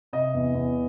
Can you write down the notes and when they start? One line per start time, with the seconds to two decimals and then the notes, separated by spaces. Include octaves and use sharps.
0.13 C3 D#5
0.34 E2
0.54 E2